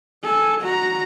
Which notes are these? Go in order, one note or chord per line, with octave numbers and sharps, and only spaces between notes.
A4 G#5
F#4 A#5